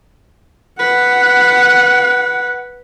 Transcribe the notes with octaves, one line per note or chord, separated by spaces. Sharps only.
B4 F#5